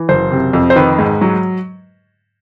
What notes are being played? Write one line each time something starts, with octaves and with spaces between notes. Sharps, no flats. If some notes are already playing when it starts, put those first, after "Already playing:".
Already playing: E3
F#1 C5
C3
F2
C5
D#3 B4
G#2
F#3